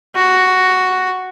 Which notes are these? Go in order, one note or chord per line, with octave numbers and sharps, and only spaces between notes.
F#4